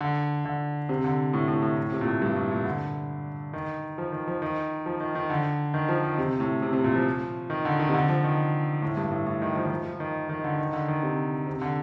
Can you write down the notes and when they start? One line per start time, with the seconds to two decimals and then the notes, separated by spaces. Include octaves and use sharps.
0.01 D3
0.45 D3
0.89 C3
1.04 D3
1.33 A2
1.48 A2
1.63 A2
1.77 A2
1.92 C3
2.01 A#2
2.07 A2
2.22 G2
2.36 A2
2.51 A#2
2.65 D3
3.53 D#3
3.98 F3
4.12 D#3
4.28 F3
4.42 D#3
4.86 F3
5.00 D#3
5.15 D#3
5.30 D3
5.74 D#3
5.89 F3
6.03 D#3
6.18 C3
6.40 A2
6.62 C3
6.73 C3
6.84 A#2
6.95 F3
7.50 D#3
7.65 D3
7.79 D#3
7.89 C3
7.94 D3
8.09 F3
8.24 D#3
8.82 A2
8.97 G2
9.11 A2
9.26 A2
9.42 D#3
9.56 F3
9.66 D#3
9.71 F3
9.85 F3
10.00 D#3
10.29 D#3
10.44 D3
10.59 D#3
10.73 D3
10.88 D#3
11.03 C3
11.47 C3
11.61 D3